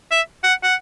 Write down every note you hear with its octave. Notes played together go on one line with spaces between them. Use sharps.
E5
F#5
F#5